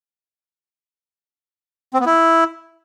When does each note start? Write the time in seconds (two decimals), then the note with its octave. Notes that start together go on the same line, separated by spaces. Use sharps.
1.94 C4
2.00 B3
2.06 E4